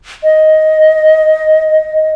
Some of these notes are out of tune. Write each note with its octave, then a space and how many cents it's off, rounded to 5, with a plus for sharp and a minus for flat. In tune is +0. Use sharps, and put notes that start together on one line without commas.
D#5 +10